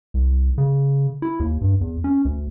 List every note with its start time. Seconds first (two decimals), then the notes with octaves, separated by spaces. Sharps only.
0.14 C2
0.58 C#3
1.22 E4
1.40 D#2
1.61 G2
1.81 E2
2.04 C#4
2.25 D2